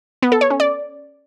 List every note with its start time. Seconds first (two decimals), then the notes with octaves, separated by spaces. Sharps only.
0.22 B3
0.32 A4
0.41 C#5
0.50 C#4
0.60 D5